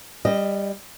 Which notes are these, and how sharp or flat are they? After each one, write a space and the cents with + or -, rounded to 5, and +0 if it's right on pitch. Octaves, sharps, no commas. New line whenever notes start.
G3 +15 D#5 +0